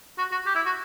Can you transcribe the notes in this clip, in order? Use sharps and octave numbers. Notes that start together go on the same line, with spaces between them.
F#4
F#4
G4
E4
F#4